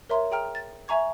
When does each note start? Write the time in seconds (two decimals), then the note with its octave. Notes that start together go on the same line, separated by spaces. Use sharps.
0.09 A#4 C#5 E5 A#5 C6
0.31 G#4 G5 A#5 F6
0.55 A6
0.88 E5 G#5 A#5 C#6 G#6